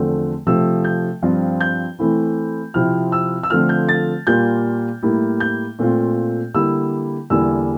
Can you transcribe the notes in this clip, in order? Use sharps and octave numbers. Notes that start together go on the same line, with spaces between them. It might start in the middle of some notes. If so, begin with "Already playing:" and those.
Already playing: E2 D3 F3 A3 C4
C3 F3 A3 E6
G6
G2 F3 C4 F4
G6
E3 A3 C4 E4
C3 F3 C4 E4 F6
E6
E6
D3 F3 A3 C4 F4 F6
G6
A6
A#2 G3 A#3 F4 G6
A2 G3 A#3 E4
G6
A#2 A3 C4 F4
D3 G3 A#3 E4 E6
E2 D3 G3 A#3 E4 E6